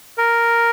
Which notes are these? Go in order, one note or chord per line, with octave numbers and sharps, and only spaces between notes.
A#4